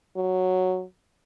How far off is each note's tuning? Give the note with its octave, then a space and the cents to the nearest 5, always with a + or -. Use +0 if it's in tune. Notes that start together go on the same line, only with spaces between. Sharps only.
F#3 -5